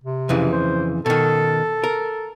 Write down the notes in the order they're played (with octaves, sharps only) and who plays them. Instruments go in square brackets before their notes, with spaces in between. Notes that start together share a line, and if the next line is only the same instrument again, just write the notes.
[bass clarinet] C3
[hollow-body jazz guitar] F2 C#3 E3
[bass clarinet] C5
[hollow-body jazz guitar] B2 D#3 [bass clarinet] A4
[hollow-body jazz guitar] A#4